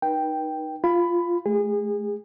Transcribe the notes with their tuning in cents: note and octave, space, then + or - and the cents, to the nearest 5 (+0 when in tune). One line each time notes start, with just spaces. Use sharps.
D#4 -10 B4 -40 G5 +0
F4 -5 B5 +15
A3 -40 G#4 -30